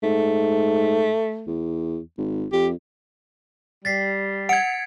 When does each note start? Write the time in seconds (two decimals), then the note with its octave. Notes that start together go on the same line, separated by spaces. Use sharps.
0.03 G#2 A3
1.47 E2
2.18 G#1
2.53 F2 G4
3.85 G3 A6 B6 C7
4.49 F#5 G#6 C#7 D7